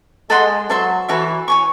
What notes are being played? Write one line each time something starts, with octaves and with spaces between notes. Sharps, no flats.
G#3 A4 D#5 F#5 C6
F#3 A4 C5 E5 C6
E3 F#4 A4 C#5 E5
C#5 G#5 C#6